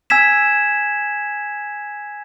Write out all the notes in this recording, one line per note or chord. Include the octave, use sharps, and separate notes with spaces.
G#5 E6 G#6 B6 E7